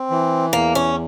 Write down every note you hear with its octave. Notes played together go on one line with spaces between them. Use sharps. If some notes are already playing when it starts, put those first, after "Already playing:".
Already playing: C4
E3
E2 A#3
C#4